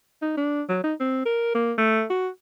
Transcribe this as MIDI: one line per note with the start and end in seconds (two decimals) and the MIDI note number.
0.22 0.36 63
0.37 0.62 62
0.69 0.81 54
0.84 0.94 63
1.00 1.24 60
1.26 1.50 70
1.55 1.73 58
1.78 2.04 57
2.10 2.28 66